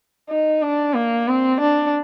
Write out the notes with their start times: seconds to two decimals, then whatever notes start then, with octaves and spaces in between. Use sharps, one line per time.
0.29 D#4
0.62 D4
0.95 A#3
1.27 C4
1.61 D4